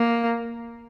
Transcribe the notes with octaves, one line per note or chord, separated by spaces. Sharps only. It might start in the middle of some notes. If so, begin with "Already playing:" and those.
Already playing: A#3